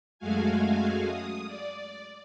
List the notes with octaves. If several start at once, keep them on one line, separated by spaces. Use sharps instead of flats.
F#2 G#3 A3 F#4 F5 G#5
D#6
D5